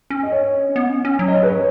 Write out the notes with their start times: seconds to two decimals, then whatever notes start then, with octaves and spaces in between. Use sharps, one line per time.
0.10 C#4
0.23 D#5
0.32 C#5
0.76 B3
0.90 C#4
1.05 C#4
1.19 F#3
1.28 D#5
1.33 C#5
1.43 B4
1.48 C#5